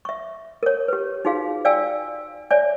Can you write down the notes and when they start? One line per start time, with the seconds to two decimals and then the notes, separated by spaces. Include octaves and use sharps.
0.05 E5 C#6
0.63 A#4 C#5
0.88 G4 B4
1.25 D#4 F4 F#4 G#4 F5
1.65 D5 F5 G5 G#5 E6
2.50 C#5 D5 E5 G#5